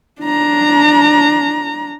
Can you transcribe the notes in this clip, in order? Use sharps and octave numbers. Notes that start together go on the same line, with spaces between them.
D4 A#5